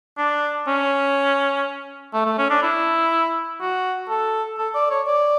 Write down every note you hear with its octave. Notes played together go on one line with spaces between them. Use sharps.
D4
C#4
A3
A3
C#4
D4
E4
F#4
A4
A4
D5
C#5
D5